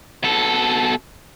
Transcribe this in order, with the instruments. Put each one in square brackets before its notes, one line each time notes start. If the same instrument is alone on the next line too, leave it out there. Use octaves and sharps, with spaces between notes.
[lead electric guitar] B2 A4